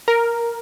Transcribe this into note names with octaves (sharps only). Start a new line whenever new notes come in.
A#4